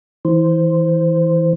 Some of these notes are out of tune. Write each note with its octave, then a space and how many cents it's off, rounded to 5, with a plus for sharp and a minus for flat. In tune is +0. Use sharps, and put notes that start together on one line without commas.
E3 -20 C5 -10